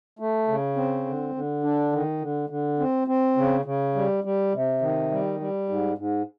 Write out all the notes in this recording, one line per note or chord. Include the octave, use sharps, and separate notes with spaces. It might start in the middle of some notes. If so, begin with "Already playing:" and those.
A3
C#3
C4
D3
D3
D4
D#3
D3
D3
C4
C4
C#3
C#3
G3
G3
C3
D#3
G3
G3
G#2
G#2